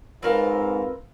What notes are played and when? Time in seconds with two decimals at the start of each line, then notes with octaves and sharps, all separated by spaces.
0.23 G#2 F3 C4 F4 A#4 B4